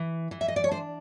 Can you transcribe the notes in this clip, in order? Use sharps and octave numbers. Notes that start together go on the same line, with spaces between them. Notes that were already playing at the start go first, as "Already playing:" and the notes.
Already playing: E3
E3
E5
D#5
D5
C#5
D4 C5